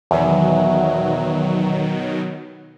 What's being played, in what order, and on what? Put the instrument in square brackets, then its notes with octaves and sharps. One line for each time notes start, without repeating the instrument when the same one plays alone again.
[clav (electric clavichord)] E2 [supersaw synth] B2 D#3 F#3